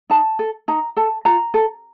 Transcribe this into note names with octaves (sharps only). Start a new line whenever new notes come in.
D#4 A5
A4
D#4 A#5
A4 A5
F4 A#5
A4